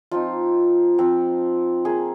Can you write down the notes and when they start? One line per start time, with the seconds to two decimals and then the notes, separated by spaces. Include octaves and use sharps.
0.11 F3 C4 D#4 F4
0.98 F3 C4 F4
1.85 A#3 F4 G#4